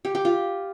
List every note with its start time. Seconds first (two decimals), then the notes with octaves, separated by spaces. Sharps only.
0.05 G4
0.15 G4
0.25 F4